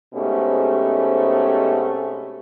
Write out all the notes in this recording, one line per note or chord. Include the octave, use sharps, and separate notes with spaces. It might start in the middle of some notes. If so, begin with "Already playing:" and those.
G#2 B2 A3 C4 C#4 G4